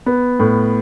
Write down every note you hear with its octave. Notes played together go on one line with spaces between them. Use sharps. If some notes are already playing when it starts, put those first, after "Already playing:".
B3
A2